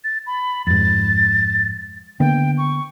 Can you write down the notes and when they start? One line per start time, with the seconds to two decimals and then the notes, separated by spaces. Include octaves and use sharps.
0.04 A6
0.27 B5
0.67 F2 G#2 A6
2.20 D3 A#3 B3 G5
2.58 C#6